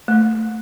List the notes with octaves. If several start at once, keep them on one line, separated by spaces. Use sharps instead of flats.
A3